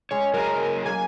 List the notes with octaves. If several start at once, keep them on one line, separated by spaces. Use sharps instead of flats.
G#3 C#4 C#5
F#3 G#4 A#4
A#3 G#5